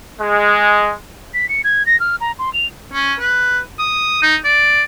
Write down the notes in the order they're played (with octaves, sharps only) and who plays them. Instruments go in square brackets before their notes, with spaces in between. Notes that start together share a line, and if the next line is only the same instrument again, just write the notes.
[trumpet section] G#3
[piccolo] B6
C#7
G#6
A#6
F6
A#5
C6
F7
[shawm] C#4
B4
D#6
D#4
D5